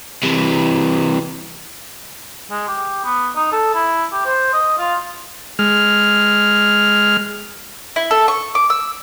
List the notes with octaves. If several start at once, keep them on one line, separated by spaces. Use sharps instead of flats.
C3 E3
G#3
G4
B3
D#4
A4
E4
G4
C5
D#5
F4
G#3 F6
E4
A4
C#6
D6
E6